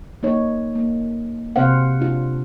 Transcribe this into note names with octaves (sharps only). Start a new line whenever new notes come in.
A#3 D#4 C#5
A#3
C3 C4 C5 F5 F#5
D4 F4